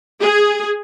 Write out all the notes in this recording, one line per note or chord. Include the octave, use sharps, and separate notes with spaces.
G#4